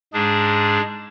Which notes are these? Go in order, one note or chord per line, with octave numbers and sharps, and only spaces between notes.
G#2 G#3 D4 G#4